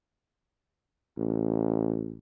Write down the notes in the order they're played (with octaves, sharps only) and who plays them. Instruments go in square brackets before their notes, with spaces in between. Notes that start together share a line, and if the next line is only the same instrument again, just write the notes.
[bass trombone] A1